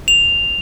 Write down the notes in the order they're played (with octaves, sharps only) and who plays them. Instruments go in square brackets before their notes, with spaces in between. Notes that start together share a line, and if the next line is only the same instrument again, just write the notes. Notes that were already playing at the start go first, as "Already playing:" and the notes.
[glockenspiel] F7